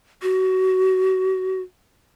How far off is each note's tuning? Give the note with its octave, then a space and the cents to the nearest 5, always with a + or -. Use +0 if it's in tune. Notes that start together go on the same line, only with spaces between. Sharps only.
F#4 +25